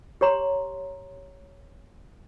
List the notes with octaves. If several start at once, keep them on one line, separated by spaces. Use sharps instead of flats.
G4 C#5 A#5 C6